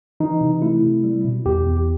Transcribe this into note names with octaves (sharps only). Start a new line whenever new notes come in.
E3 D#4
C3
A3 E4
C3
G3
B2
E2 G4
E2